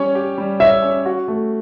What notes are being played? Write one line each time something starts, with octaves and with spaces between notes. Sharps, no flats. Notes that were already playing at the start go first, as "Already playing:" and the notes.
Already playing: G3 C#4 C#5
G4
G3
C#5 E5
C#4
F#4
A3